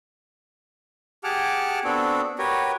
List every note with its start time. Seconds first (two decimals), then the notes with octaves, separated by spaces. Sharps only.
1.24 G4 G#4 F#5 A5 D6 F6
1.84 B3 C4 D4 F#4 A4
2.38 F#4 G4 A#4 B4 C#5